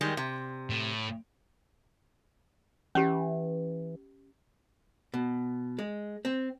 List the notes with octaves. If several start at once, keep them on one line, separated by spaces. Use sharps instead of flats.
D#3 G3 G#3
C3
A2
E3 C#4 G4
B2
G#3
C4